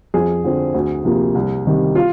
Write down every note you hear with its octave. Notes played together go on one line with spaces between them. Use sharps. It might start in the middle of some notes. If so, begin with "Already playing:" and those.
F2 G#4
D3 F3 C4
D2
C3 F3 A#3
C2
C3 D#3 G3
F4